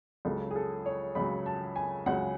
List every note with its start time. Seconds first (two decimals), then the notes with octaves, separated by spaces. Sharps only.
0.25 C#2 C#3 F#3 A4
0.51 G#4
0.56 A4
0.86 C#5
1.15 C#2 C#3 F#3 B5
1.46 A5
1.76 G#5
2.06 C#2 C#3 F#3 F#5